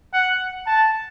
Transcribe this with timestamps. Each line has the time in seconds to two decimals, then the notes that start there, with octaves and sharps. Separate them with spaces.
0.13 F#5
0.66 A5